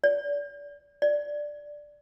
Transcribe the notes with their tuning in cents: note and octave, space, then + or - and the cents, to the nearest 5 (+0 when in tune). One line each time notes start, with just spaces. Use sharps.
D5 -30
D5 +0